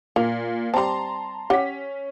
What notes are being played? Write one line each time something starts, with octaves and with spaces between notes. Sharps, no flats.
A#2 A#3
G3 C4 A5 A#5 C6
C#4 G4 F#5 B6